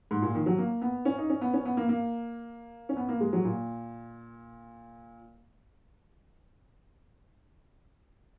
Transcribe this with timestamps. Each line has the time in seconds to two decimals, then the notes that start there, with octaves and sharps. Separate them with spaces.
0.11 G#2
0.22 A#2
0.35 D#3
0.46 F#3
0.58 A#3
0.82 B3
1.05 C#4
1.18 D#4
1.30 C#4
1.41 B3
1.53 C#4
1.65 B3
1.77 A#3
1.89 A#3
2.89 C#4
2.97 B3
3.09 A#3
3.21 G#3
3.33 F#3
3.45 A#2